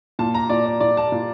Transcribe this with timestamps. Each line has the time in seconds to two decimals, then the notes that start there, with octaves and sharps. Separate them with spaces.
0.19 A#2 A5
0.34 A#5
0.50 A#2 D5
0.66 D5
0.80 A#2 D5
0.97 A5
1.12 A#2